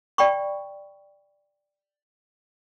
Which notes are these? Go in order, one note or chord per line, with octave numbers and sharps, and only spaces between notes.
D5 G5 B5 C#6